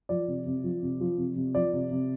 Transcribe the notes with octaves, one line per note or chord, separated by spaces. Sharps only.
F3 D5
C3
C3
F3
C3
F3
C3
C3
F3 D5
C3
C3